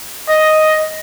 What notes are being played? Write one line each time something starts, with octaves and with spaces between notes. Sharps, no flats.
D#5